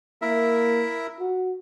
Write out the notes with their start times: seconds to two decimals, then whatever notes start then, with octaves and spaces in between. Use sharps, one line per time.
0.22 A#3 E4 A#4 E5
1.20 F#4